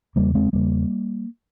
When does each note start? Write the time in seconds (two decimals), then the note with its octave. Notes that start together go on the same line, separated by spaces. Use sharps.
0.16 E2 C#3 G3 A#3
0.35 G#3 C4
0.53 E2 C#3 G3 A#3